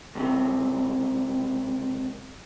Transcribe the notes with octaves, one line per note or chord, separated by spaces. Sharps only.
C#2 A2 C3